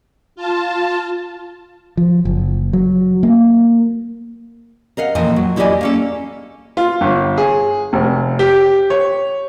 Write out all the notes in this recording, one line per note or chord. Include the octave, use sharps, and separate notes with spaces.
F4 A5
F3
F#1
F#3
A#3
A#4 D#5 F5 F#5
F2 A#2 E3 D#5 G5
F#3
E2 E4 G4 D5 D#5 G#5
A#3 C#4 A4
F4
G1
G#4
F1
G4
C#5